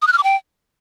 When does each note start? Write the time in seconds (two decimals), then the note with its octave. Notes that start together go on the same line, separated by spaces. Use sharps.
0.02 D#6
0.07 F#6
0.13 F6
0.18 D6
0.24 G5